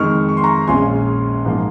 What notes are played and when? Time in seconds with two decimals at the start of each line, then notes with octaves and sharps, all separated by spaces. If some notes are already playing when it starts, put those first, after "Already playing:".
Already playing: F2 D#3 G#3 C#6 F6
0.29 C#6
0.37 C6
0.44 A#5 C#6
0.67 A#1 A#2 G#3 C#4 F4 G#5 C6
1.45 G#2 F3 A#3 F4